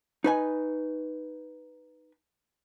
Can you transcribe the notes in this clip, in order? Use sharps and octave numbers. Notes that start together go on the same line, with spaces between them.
D#4 B4 G#5